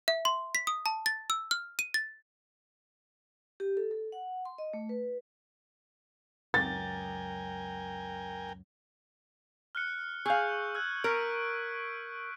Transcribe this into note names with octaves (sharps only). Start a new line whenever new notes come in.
E5
C6
B6
D#6
A5
A6
E6
F6
D#7
A6
G4
A4
A4
F#5
C6
D#5
A3
B4
C#2 F#2 A#4 G5 G#5 A6
F6 F#6 C#7
G#4 F5 C#6 E6 G6
E6 F#6 G#6
A#4 C#6 B6 D7